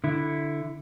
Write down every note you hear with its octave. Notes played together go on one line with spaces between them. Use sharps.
D3 E4